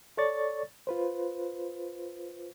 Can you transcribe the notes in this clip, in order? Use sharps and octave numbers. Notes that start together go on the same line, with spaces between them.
A4 C#5 D5 C#6 A6
F4 B4 C5